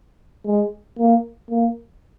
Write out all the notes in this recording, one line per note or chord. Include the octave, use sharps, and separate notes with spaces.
G#3
A#3
A#3